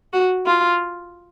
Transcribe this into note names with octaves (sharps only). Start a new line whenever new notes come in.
F#4
F4